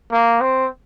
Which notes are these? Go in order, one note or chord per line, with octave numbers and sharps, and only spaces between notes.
A#3
C4